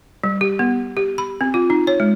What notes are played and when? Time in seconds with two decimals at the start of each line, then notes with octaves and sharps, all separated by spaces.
0.24 G3
0.41 G4
0.59 B3
0.97 G4
1.18 B5
1.41 C4
1.54 F4
1.70 D#4
1.87 C#5
2.00 G#3